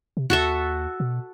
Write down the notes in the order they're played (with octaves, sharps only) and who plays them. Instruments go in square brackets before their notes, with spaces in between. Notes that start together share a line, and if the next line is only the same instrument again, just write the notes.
[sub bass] C3
[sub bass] D#2 [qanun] F#4 A4 E5
[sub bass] B2